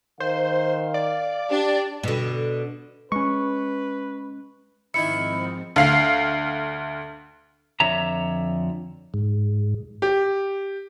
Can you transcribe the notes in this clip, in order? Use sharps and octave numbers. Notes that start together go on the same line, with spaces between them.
D#3 C5 F5
D5
D4 G4
B2 D3
G#3 C#4 B4 C#6
G#2 D#3 F3 C4 E4 E5 B5 C#7
D2 F5 C7
F2 D3 C#5 E5 A#5
G#2
G4